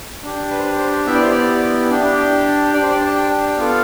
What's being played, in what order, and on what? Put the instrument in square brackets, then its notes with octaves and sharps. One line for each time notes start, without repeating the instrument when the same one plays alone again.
[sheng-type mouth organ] D4 G4
B4
C5
B4
C5
B3 E4 G4 E5
D5
C5
D5
D4 G4
D4 G4 D5
C5
D5
A5
G5
G5
B3 F4 A4 F5